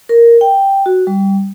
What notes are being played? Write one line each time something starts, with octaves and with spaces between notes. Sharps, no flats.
A#4
G5
F#4
G3